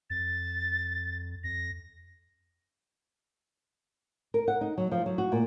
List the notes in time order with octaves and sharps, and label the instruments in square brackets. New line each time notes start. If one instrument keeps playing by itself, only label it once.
[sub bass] F2 [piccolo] A6
[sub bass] F2 [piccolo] A#6
[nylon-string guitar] A#4
F#5
D#4
F#3
F3
F#3
F#4
A#2